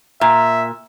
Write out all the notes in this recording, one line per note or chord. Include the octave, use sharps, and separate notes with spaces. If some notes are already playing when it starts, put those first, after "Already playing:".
A#2 E5